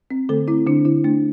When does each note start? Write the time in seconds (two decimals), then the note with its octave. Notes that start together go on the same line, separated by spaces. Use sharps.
0.11 C4
0.29 D3 A3 A4
0.48 C4 E4
0.67 D3 D4
0.85 D3 E4
1.04 A3 D4